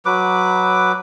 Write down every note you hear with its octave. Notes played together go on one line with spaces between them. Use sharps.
F#3 B4 D6